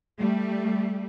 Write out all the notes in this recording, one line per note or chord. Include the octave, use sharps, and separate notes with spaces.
G3 A3